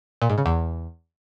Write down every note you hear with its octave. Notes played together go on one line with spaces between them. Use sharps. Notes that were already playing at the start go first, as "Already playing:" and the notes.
A#2
G#2
C#3
E2